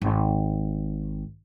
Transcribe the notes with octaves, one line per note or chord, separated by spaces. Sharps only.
G#1